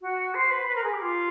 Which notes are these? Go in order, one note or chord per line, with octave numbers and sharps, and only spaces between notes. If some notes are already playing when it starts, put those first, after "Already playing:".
F#4
C5
B4
B4
A#4
G#4
G4
F4